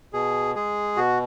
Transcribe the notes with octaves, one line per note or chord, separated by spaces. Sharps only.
B2 G#4
G#3 G#4
B2 F#4